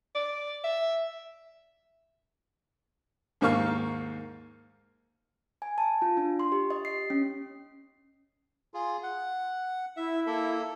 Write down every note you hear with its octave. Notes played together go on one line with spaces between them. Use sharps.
D5
E5
D#2 G#2 A#3 F5 C#6
G#5
A5
F4
D4
C6
G4
D#5
C7
C#4
F4 G#4
F#5
E4 E5
A#3 A4